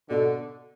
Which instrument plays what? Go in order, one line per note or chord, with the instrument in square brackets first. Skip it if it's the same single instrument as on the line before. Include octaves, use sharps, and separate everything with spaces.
[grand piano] B2 [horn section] D3